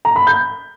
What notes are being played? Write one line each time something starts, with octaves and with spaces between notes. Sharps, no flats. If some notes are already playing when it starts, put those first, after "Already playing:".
A#5
B5
G6